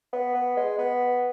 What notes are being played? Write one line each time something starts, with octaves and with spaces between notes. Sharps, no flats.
B3
B3
G#3
B3